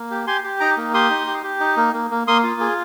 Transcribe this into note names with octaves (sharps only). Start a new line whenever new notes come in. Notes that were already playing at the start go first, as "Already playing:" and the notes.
Already playing: A#3
G4
G4 G#5 C6
G4
D#4 A#5 D6
A#3
G4 C6 D#6
D#4
G4
G4
D#4
A#3
A#3
A#3
A#3 C6 D#6
F4
G#4